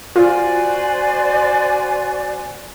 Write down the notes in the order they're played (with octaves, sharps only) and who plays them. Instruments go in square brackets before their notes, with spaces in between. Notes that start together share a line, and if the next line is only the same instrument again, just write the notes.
[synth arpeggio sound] F4 [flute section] F#4 C5 G#5 [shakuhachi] D5